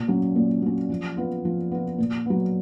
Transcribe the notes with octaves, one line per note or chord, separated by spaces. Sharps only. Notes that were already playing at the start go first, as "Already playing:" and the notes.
Already playing: A#2
F#3 C#4
A#2
F#3 C#4
F3
B3 F4
F3
B3 F4
A#2
F#3 B3